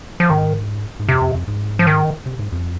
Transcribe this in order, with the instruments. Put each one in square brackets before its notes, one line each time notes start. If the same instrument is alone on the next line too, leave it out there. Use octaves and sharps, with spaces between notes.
[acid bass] F3
[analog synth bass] G#2 [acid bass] D#3
[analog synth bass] G#2
[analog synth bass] F2 [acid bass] C3
[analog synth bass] F2
F2
G#2
[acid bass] F3
D#3
[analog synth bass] C3
G#2
F2